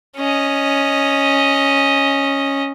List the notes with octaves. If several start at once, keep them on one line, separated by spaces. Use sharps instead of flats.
C#4 D#5